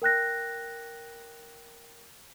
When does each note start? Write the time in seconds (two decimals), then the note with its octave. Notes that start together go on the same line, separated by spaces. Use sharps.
0.02 A#4 G5 F#6 A#6